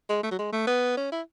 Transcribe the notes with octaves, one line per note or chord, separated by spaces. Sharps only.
G#3
A3
F#3
G#3
A3
B3
C#4
E4